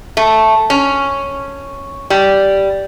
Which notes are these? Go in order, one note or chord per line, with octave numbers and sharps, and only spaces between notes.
A3
C#4
G3